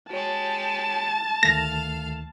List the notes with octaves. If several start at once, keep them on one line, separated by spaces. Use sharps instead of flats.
G#3 F#4 G4 C#5 A5
D2 D#3 A3 F5 A#6